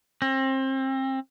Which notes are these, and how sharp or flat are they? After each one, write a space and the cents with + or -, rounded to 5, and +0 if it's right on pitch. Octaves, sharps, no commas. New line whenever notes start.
C4 +30